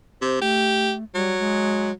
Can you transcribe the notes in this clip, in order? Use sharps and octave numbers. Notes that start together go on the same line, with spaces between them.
C3 C5
A3 G4
F#3 G3
G#3